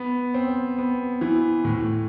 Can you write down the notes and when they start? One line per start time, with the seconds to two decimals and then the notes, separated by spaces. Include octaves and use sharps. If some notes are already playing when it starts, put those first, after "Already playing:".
Already playing: B3
0.34 C4
0.78 B3
1.21 E3
1.65 A2